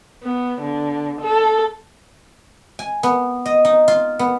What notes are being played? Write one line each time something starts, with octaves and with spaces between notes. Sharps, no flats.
B3
D3
A4
G#5
B3
D#5
D#4
F4
B3